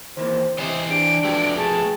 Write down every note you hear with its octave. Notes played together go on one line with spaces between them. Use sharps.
D#3 E3 A#3 C5
C3 E3 C5 C#5 D#5
D4 G4 D7
F3 A3 F#4 B4 G5
G#4 A5